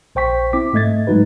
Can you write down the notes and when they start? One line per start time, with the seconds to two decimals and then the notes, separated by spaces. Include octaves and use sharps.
0.15 A#1 C5 G5 C#6 B6
0.53 C4 E4 D6 B6
0.73 G#2 A3 D#5 G#6 A6
1.07 G#2 F#3 G#3 D#4 F#4 B4